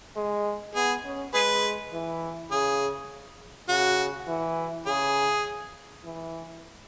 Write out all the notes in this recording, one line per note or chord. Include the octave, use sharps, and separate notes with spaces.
G#3
B3 G#4
C#4
G#3 G#4 B4
E3
C#3 G#4
C#3 F#4
E3
C#3 G#4
E3